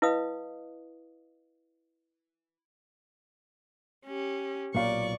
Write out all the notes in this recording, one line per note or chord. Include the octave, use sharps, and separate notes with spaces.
E4 B4 D#5 F5 D#6
C#4 G4
B1 A#2 D5 F5 C#6